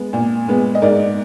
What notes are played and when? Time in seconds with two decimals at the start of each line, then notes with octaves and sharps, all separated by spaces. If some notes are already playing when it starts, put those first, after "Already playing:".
Already playing: G#3 B3
0.13 A#2
0.48 G#3 B3
0.75 D#5
0.82 G#2 A#4 D5